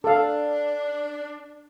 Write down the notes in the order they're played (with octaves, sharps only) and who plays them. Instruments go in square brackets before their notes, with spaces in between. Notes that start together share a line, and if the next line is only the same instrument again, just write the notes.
[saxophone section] D4 [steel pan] A4 F5